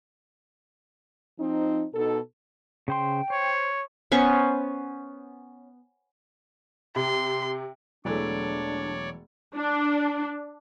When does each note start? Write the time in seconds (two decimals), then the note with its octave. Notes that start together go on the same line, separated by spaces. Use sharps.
1.39 F3 C4 D#4
1.94 B2 D#4 A4
2.88 C#3 C5 G5 C6
3.30 C5 C#5
4.12 B3 C#4 C5 C#6
6.96 C3 C6
8.05 E1 E3 F#3 G#3 A3 D4 C#5 D5
9.56 D4